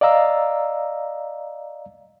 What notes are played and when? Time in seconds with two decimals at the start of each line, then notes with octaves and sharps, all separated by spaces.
0.01 D5 D#5 F5 A#5 E6